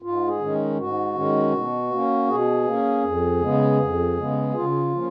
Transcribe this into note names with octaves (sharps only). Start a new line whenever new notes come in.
G#2 F4
G#4
D#3 G#3 C#4
G#2 F#4
D#3 G#3 C#4
B2
A#3 C#4
B2 G#4
A#3 C#4
F2
C#3 G#3 B3
F2
C#3 G#3 B3
C#3 F4
F3 A#3 C#4